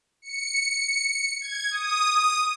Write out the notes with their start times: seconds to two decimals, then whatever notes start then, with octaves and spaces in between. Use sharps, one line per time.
0.22 C#7
1.41 G#6
1.71 D#6